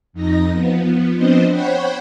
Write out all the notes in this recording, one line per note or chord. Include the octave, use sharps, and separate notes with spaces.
F2 D#4 A#6
F3 B3
F3 B3 C4 D4 C5 D#5
C5 C#5 F#5 G5 B5